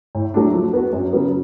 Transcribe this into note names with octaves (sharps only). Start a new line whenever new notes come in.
A2
F#3 A3 D4
F3
B3 F#4
F#2
C#3 F#3 B3